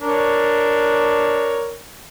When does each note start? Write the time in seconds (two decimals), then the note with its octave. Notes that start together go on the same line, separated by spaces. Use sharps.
0.01 D4 A#4 C#5